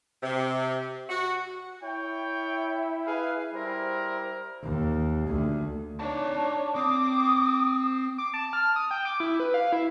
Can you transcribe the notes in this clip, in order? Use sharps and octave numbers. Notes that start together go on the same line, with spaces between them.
C3
F#4
E4 C#5 G5
G#4 B4 F5
G3 E4 A#4 C5
D#2
D2
D4 D#4 C#5 A5
C4 D6 D#6
D6
A5
F6
D#6
G5
D6
E4
B4
F5
E4